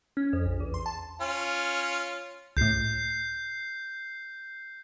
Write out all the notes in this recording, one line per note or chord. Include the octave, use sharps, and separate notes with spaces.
C#4
F2
A#1
E2
C6
A5
C#4 F4
C#2 A2 G6 C7